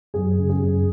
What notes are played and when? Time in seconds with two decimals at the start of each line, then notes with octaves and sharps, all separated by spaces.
0.14 F#2 G#4
0.38 C#3
0.49 G#4
0.62 F#2